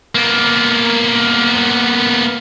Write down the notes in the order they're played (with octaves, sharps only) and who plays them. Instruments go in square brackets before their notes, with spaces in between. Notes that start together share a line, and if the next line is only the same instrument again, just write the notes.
[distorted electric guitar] A#3 B3